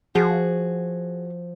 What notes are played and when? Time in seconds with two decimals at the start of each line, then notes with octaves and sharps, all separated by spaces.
0.15 F3 F#4 G#4